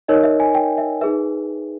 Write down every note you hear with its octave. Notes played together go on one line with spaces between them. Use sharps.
D#4 A#4 C#5 D#5
E5
G#5
G5
E5
D#4 G#4 B4 E5